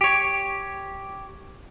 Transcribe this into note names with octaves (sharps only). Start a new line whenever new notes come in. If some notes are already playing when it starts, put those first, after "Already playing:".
G4 C#5